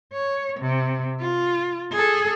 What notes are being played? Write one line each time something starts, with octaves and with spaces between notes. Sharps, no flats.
C#5
C3
F4
G#4 A4